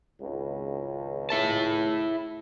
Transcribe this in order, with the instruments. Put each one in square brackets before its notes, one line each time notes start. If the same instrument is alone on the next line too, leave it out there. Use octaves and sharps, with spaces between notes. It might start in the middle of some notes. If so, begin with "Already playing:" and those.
[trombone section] G#1 C#2
[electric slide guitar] E4 E5 A5